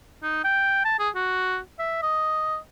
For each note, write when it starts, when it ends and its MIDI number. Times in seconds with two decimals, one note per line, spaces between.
0.23 0.42 63
0.44 0.83 79
0.85 0.96 81
1.00 1.09 68
1.16 1.58 66
1.79 1.99 76
2.03 2.57 75